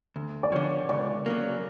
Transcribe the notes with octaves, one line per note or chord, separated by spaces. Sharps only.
D2
D5
D3 F3 C#5
C#2 D5
C#3 F#3 A#3